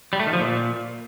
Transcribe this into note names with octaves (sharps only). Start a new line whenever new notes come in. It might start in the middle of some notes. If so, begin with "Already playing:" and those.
G3
A3
D#3
F3
A#2